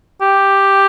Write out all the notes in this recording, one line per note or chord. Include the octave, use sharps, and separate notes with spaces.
G4